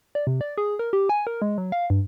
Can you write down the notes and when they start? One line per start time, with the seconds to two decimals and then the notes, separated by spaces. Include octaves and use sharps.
0.15 D5
0.27 C3
0.41 D5
0.58 G#4
0.79 A#4
0.93 G4
1.09 G#5
1.27 A#4
1.42 G#3
1.58 F#3
1.72 F5
1.90 G2